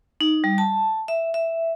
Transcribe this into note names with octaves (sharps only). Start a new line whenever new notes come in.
D#4
G3
A5
E5
E5